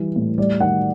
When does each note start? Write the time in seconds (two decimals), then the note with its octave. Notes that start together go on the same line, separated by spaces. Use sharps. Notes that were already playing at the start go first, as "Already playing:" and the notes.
Already playing: E3 G3
0.16 A2
0.38 G3 D5
0.60 D#3 F#5